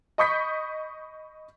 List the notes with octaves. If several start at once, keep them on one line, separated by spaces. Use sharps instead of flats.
D#5 B5 C#6 D#6 G6 B6